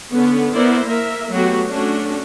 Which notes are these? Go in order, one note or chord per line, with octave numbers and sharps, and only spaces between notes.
D3 B3 C#4
B3 E4 A#4 C5 D5
A#3 A#4 E5
F#3 A3 B3 F#4 G4
A3 C#4 D4 F#4